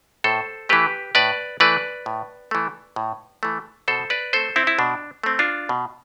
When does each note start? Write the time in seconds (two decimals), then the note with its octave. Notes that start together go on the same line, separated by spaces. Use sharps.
0.24 A2 A4 C5
0.69 E3 A3 G4 B4
1.15 A2 B4 D5
1.60 E3 A3 B4 D5
2.06 A2
2.51 E3 A3
2.96 A2
3.43 E3 A3
3.88 B2 A4 C5
4.10 B4 D5
4.33 A3 C4 A4 C5
4.56 C4 E4
4.67 E4
4.79 B2 D4
5.24 A3 C4
5.39 D4 F4
5.69 B2